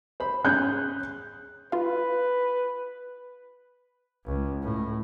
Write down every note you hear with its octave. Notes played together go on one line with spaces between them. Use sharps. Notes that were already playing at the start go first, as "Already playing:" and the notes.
C5 B5
C#4 G#4 C#5 F#6 G6
F4 B4 F5
C#2
A2